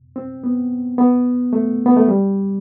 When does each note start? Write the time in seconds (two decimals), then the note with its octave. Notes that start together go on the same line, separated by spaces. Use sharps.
0.16 C4
0.44 B3
0.98 B3
1.53 A3
1.86 B3
1.97 A3
2.08 G3